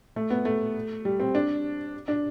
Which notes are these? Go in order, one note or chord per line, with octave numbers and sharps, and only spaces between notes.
A3
B3
A3
G3
C4
D4
D4